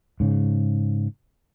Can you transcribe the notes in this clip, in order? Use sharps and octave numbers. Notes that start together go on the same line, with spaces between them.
G#2 C#3